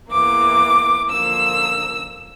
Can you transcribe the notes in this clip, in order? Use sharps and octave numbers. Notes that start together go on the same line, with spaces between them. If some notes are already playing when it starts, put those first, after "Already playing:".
E2 E3 A#3 D6
D3 F3 A#3 E6